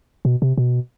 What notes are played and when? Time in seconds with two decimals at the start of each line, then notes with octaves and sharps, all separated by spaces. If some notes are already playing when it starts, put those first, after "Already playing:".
0.25 B2
0.42 C3
0.58 B2